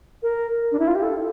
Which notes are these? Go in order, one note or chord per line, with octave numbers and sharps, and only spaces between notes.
A#4
D4
E4
F4
G4
A4